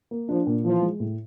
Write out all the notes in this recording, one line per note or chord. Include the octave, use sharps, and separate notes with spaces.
A#3
F3 D4
A#2
E3 F3
G#3
A2